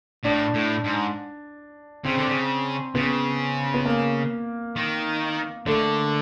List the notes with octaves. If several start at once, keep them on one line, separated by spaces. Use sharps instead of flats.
A2 D4
A2
G#2
C#3 C4
D3
C#3
C#3 B3
B3
A#3
D#3
D3 A3